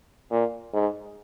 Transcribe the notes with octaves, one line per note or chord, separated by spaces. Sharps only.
A#2
G#2